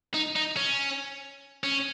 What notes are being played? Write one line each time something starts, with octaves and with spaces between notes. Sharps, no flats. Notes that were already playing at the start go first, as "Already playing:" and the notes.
D#4
D#4
C#4
C#4